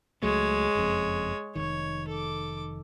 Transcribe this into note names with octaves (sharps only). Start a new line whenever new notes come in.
C#2 F#3 G#3 A3 C#5
F#1 F2
F1 C2 D#3 C#5
A4 D6